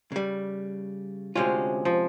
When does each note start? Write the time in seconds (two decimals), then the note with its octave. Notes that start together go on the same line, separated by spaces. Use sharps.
0.12 C#3 G3
1.35 D2 C3 G#3 C#4 F4
1.85 F3